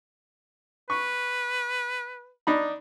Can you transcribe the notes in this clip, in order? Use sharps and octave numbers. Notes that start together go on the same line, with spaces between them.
B4 C#6
D4 D#4 B5